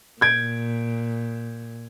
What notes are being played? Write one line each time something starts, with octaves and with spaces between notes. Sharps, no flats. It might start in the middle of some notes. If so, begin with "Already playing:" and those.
A#2 G6 G#6 D7